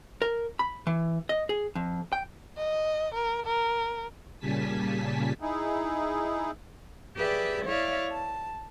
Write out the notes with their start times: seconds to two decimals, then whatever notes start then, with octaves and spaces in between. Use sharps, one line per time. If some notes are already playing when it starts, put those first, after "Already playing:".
0.22 A#4
0.59 B5
0.87 E3
1.29 D#5
1.49 G#4
1.75 F2
2.13 G5
2.57 D#5
3.14 A#4
3.46 A#4
4.40 A#2 C#3 G3 G#5 A5 B6
5.40 D#4 E4 G#4
7.17 G4 G#4 B4 D5 E5
7.66 E4 C#5 D5 E5 F5
8.10 A5